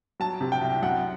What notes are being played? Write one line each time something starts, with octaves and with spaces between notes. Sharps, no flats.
F#3 A5
C3
G5
C2
F#2 F#5